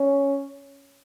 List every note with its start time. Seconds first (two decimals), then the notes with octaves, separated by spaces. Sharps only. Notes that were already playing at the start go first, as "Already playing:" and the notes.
Already playing: C#4